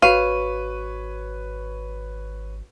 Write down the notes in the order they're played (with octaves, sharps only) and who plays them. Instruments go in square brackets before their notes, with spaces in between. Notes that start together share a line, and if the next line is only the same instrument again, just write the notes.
[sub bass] G#1 [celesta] F#4 C#6 D#7 [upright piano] B4 C#5 [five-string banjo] F5